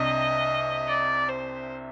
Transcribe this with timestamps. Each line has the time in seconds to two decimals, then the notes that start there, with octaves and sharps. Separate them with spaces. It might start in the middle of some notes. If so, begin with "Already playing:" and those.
Already playing: C2 C3 D4 D#5
0.88 D5
1.29 C5